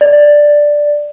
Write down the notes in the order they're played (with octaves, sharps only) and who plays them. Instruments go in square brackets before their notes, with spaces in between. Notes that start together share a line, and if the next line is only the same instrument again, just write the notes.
[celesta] D5